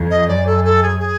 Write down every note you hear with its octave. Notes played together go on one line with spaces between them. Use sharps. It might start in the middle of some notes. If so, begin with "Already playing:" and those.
Already playing: F2
D#5
F#2 D5
A4
A4
G#4
G#4